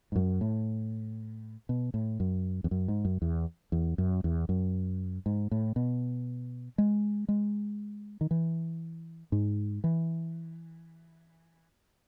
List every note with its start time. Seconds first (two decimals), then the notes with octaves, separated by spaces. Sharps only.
0.12 G#2
0.16 F#2
0.41 A2
1.69 B2
1.94 A2
2.20 F#2
2.64 E2
2.71 F#2
2.88 G#2
3.05 F#2
3.22 E2
3.72 E2
3.98 F#2
4.24 E2
4.49 F#2
5.26 G#2
5.51 A2
5.76 B2
6.78 G#3
7.28 G#3
8.21 D#3
8.31 E3
9.32 G#2
9.84 E3